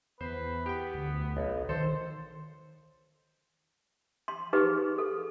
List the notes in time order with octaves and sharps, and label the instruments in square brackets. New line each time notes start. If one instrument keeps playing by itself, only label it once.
[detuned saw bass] E2 [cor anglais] B4 [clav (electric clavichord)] C5
[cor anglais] B3 [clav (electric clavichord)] G4 G5
[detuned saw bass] D2
[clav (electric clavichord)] B1
[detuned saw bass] D#3 [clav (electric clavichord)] A4 [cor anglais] C5
[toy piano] C6
D#4 G4 G#4 B4
G#4
A4